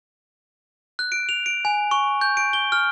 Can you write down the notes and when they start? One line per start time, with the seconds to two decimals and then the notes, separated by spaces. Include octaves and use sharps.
0.99 F#6
1.12 D7
1.29 F7
1.46 D7
1.65 G#5
1.91 C#6
2.21 G6
2.37 D7
2.53 G7
2.72 F6